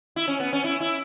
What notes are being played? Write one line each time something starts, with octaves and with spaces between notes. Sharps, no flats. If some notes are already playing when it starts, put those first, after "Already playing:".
E4
C#4
B3
C#4
E4
E4